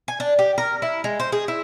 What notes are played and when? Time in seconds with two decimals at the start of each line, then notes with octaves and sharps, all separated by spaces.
0.08 G#5
0.20 D4
0.39 G4
0.58 A#4
0.82 E4
1.04 G#3
1.20 C5
1.32 G#4
1.48 E4